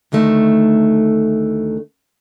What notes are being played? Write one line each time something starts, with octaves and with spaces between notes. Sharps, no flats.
D2 D3 D#3 A3